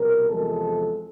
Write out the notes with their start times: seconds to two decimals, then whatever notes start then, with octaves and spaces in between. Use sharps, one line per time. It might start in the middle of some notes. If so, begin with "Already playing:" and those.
Already playing: C2 B2 G3 A#4
0.29 E2 C3 F3 G#3 A4